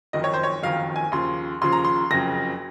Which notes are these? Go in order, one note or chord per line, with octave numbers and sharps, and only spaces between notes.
F#1 F2 D#3 F#3 D#5
C#5
C5
C#5
F#1 F2 D#3 F#3 F5
G#5
D#2 C#3 F3 C6
D#2 C#3 F3 C6
A#5
C6
F#1 F2 C#3 F#3 A#6